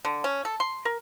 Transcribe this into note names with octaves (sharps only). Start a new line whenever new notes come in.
D3
C#4
A4
C6
A#4